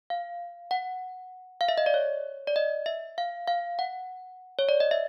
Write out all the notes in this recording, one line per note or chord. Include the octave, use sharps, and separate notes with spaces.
F5
F#5
F5
E5
D#5
D5
C#5
D5
D#5
E5
F5
F5
F#5
C#5
D5
D#5
E5